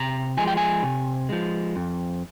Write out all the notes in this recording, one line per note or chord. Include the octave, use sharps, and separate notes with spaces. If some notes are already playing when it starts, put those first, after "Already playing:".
Already playing: C3 A#5
F3 G#3 G#5
G5
G#5
C3
F3 G#3
F2